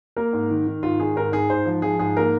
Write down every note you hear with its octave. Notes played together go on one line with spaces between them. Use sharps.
A#3 A#4
G#2
D#3
D#3
G#2 F4
D#3 G#4
G#2 A#4
G#2 G#4
G#2 C5
F3
F3 G#4
G#2 G#4
A#3 A#4